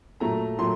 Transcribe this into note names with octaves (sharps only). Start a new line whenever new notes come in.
A#2 F#3 A3 A#5
A#2 F#3 A3 C6